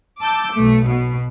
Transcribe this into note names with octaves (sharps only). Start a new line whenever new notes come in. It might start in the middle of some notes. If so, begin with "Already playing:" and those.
A5 D6 E6 G6
B1 A3
B2